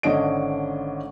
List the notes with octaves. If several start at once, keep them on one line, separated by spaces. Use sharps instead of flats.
G#1 D3 C#4 D4 D#5 D7